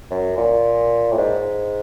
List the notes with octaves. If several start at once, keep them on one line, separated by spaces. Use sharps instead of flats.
F#2
A#2
A2
G#2